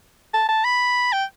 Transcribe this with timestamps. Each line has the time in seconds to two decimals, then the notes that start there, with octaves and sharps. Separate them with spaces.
0.34 A5
0.49 A5
0.65 B5
1.13 G5